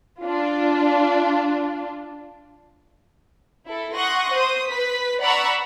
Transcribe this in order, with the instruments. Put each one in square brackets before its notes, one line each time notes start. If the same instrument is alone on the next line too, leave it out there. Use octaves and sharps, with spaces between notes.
[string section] D4 F4
[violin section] E4 A4
F#5 C6 C#6 D#6 F#6 A#6
C5 D#6
B4 B6
D5 F#5 A#5 B5 C#6 E6